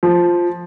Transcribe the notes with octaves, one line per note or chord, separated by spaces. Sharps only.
F3